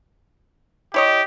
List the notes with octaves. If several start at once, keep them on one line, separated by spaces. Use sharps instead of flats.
E4 G4 C#5 D#5